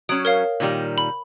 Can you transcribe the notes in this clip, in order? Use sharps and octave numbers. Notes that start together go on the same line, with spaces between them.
F#3 C#4 D#6 D7
A#4 C#5 F5
A#2 D#3 G3
B5